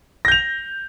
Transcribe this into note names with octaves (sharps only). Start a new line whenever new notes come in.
G6 A#6 F7